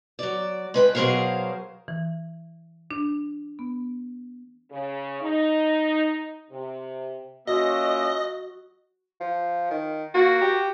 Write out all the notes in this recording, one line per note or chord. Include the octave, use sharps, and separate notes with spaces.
F#3 D5
G#3 B4 G5
B2 F#3 G#4 A#4 C5 F5
E3
D4
B3
C#3
D#4
C3
A#3 C#4 F4 F#4 D#5 E5
F3
D#3
A#3 F#4
G4